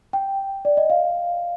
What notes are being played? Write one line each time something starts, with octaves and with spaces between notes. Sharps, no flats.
G5
D5
D#5
F5